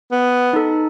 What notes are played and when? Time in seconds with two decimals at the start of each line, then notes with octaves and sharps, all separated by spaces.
0.11 B3
0.53 D#4 A4